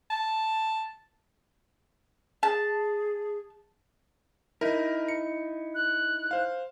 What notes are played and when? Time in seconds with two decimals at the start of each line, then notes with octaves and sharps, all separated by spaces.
0.10 A5
2.43 G#4 A5
4.61 D#4 E4 A#4
5.08 C#7
5.75 F#6
6.31 C5 F5